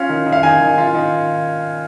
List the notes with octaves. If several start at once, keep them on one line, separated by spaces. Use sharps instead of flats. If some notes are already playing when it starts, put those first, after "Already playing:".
Already playing: C#4 F4 F5
D#3
D#3
F5
D#3 G#5
D#3
F4
D#3